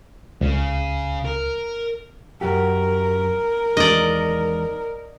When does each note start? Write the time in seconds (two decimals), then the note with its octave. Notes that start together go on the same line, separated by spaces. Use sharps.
0.41 C#2 C#3
1.25 A#4
2.41 F#2 F#4 G4 A#4
3.77 E2 D#3 G#3 D5 D#5